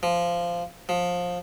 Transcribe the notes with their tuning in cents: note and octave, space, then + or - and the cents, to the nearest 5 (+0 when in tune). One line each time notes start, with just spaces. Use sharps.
F3 -15
F3 +20